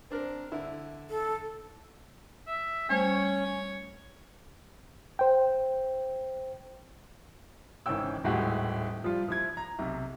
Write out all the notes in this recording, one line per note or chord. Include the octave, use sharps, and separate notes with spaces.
C4 D4 A#4
D3 E4
A4
E5
G3 A3 C#4 C5 C#5
C5 G5
G#1 D#3 E3 C#4 G5 E6
D#1 A2 G#3 F#4 G4
F3 G3 F4
F3 E4 G#6
A#5
B1 C3